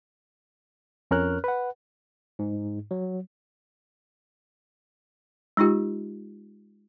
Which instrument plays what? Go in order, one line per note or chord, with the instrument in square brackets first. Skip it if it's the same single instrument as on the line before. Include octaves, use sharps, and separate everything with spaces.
[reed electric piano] F2 C#4 A#4 C#5 F6 F#6
B4 F#5
[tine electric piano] G#2
F#3
[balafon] G#3 D#4 F4 G4